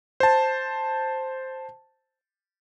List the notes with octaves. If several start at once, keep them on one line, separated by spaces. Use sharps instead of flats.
C5 A5